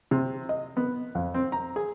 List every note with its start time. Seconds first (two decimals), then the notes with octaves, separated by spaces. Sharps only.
0.11 C3
0.49 D#5
0.77 B3
1.15 F2
1.34 C4
1.52 A#5
1.76 G#4